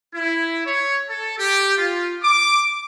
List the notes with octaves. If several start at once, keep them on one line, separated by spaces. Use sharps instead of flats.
E4
C#5
A4
G4
F4
D6